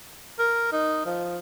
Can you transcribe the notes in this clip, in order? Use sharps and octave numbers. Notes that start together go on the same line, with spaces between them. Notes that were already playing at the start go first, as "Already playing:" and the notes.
A#4
D#4
F3